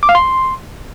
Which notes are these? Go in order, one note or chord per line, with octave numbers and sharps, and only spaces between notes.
D6
F5
C6